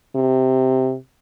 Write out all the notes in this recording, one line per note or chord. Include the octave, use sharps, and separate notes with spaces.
C3